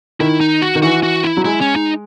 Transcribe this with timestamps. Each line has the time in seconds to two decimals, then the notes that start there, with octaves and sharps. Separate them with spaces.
0.20 D#3 E4
0.41 D#4
0.62 F#4
0.75 D#3
0.82 E3 F#4
1.03 F#4
1.24 E4
1.37 F#3
1.44 G#3 E4
1.61 C#4
1.76 D#4